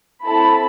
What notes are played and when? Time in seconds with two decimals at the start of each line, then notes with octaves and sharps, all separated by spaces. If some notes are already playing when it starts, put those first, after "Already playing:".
0.25 C4 E4 A4 A5 B5